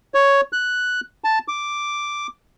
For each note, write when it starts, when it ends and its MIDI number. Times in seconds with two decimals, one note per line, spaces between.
0.14 0.41 73
0.53 1.00 90
1.24 1.39 81
1.48 2.27 86